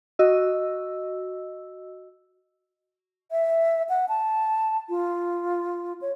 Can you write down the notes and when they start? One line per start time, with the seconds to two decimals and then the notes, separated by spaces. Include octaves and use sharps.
0.19 F#4 D#5 E6
3.32 E5
3.89 F#5
4.09 A5
4.90 F4
6.01 C#5